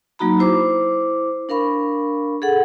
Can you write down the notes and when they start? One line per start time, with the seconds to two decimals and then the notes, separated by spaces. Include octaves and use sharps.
0.19 F#3 A#3 D#4 F#4 A#5 B5
0.39 E4 C5 D6
1.49 D4 A#4 F5 B5 C#6
2.42 G#4 A4 F#5